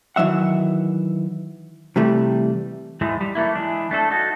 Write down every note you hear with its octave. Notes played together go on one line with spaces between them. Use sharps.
D#3 E3 F#3 E5 F#5
C3 E3 G3 A3
G#2 E3 G#3 A3
G3
E3 A3 A#3 E4
E3 G#3 D4
A3 D4 A4
D#4 F#4 A4